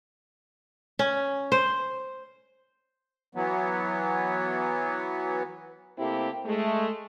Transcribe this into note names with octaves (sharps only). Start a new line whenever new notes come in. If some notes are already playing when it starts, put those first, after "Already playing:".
C#4
C5
E3 F#3 B3
C3 A3 A#3 C4 E4 G4
G#3 A3